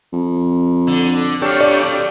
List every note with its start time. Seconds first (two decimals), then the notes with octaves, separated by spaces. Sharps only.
0.13 F2
0.88 D3
1.42 D4 G4 A4 C#5 F5
1.61 D5